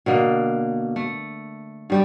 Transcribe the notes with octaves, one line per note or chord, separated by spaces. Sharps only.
B2 D3 A#3
A3
G2 G3 G4